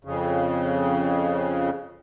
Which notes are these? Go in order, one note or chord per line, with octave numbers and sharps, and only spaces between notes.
F2 C#3